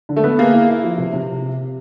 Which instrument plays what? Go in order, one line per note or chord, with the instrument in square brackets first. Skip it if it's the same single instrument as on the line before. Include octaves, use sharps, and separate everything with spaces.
[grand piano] D3
[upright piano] A3
[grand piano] B3
[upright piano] A#3 [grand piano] G#4
[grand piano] E4
E4
F3
C3
C3